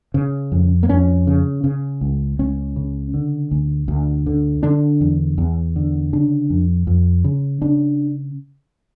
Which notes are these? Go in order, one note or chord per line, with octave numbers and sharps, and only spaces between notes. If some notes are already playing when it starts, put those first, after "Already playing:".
C#3
F2
A#3
F2 C#4
C#3
C#3
C#2
C#2 C#4
C#3
D3
D2
D2
D3
D3 D4
E2
E2
D3
C#3 D4
F2
F2
C#3
C#3 D4